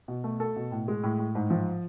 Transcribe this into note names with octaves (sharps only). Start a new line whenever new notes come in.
B2
A3
A4
B2
A2
G#3
A2
A2
G#2
F3